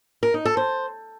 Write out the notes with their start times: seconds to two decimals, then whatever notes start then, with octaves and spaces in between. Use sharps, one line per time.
0.23 A#4
0.34 D#4
0.45 A4
0.57 C5